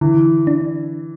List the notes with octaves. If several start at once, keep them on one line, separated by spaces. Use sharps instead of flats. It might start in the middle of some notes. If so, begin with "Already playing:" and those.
D3 E3
D4